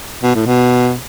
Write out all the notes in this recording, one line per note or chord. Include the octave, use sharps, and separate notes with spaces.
B2
A2
B2